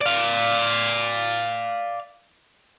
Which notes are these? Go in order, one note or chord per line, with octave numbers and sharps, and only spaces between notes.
D5 F5